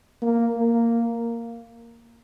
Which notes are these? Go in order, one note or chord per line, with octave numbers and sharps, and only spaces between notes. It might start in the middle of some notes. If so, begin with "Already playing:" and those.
A#3
A#3